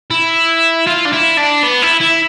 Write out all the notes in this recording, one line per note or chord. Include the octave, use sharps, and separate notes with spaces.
E4
F4
D4
E4
D4
B3
E4
E4